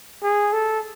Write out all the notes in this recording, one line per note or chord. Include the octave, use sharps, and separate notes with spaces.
G#4
A4